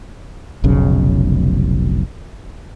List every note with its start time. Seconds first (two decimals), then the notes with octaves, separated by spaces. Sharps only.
0.64 F1 B1 C#3